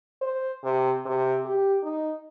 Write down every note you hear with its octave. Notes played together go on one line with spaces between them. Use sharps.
C5
C3
C3
G4
D#4